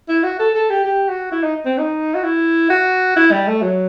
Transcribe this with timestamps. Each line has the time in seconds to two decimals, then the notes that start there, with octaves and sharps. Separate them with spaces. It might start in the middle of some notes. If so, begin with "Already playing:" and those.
0.09 E4
0.23 F#4
0.39 A4
0.55 A4
0.70 G4
0.85 G4
1.09 F#4
1.32 E4
1.43 D#4
1.66 C4
1.78 D#4
2.15 F#4
2.24 E4
2.70 F#4
3.16 E4
3.32 G3
3.48 A3
3.62 F#3